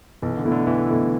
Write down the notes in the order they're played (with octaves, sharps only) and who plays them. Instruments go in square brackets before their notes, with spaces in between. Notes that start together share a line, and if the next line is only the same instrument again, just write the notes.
[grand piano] B1 [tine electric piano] E3
[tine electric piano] D3
[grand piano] B2 A3 E4
[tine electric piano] D3
[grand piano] B1 [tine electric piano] E3
[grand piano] B2 A3 E4